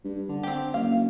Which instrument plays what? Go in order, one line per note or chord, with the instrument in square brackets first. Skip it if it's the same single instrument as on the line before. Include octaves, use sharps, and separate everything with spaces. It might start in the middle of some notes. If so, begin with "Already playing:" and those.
[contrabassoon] G2
D3
[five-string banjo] C4 G4
[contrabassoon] F#1 [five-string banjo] F5